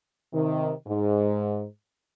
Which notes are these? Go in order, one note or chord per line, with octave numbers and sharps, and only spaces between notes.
C3 D#3
G#2